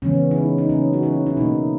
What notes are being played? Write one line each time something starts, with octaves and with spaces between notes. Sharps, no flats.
C#3 E3 G#3 B3 C#4
E4
D#4
D#4
C#3 F#3 A#3 C#4
F#4
C#4 E4
E4
B2 A#3 D#4